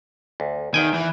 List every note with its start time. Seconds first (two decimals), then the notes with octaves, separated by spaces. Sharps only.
0.40 D2
0.74 E2 D#3 G5 G#5
0.94 E3